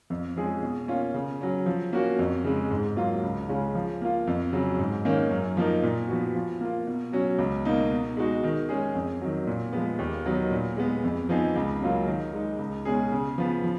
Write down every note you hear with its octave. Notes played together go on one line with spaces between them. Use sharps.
F2
F3 G#3 C#4 G#4
B2
A#3 C#4 F4
C#3
F#3 C#4
F3
A#3 C#4 F#4
F2
C#3 G#3
G#2
F#3 A#3 F4
C#2
C#3 G#3 C#4 F4
F3
A#3 F4
F2
C#3 F#3
G#2
D#3 A#3 C#4
F#2
F3 A#3 D#4 A#4
A#2
F3 B3 F#4
F3
A#3 F4
B2
F#3 C#4 F#4
C#2
B2 A#3 D#4
B2
G#3 D#4 F#4
D#3
G#3 C#4 G#4
F2
D#3 F#3
A#2
F3 G#3 B3
D#2
D#3 F#3 B3 D#4
A#2
G#3 B3
F2
F3 B3 D#4 G#4
C#2
C#3 F#3 A#3 F4
D#3
G#3 D#4
C#2
B2 G#3 C#4 G#4
C#3
F3 B3
F3